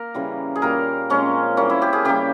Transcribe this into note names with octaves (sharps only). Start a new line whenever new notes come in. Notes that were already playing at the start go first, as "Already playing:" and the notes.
Already playing: A#3 A#4
C#3 E3 G3
G#4
A#2 G3 A#3 A#4
A#2 F3 G#3 C4 C#4
E3 G3 A#3 C#4
E4
G4
G#4
C#3 G3 A#3 G4